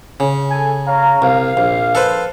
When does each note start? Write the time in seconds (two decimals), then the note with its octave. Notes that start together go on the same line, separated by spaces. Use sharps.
0.20 C#3
0.50 A4 G#5
0.87 C#5 F5 A#5
1.22 C2 F5
1.57 A#1
1.95 A4 B4 C5